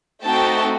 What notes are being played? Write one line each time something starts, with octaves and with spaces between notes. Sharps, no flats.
A3 C4 D#4 F#4 G5 A5